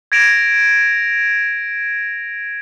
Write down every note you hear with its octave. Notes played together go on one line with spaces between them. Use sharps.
G#6 A#6 D7 E7 F7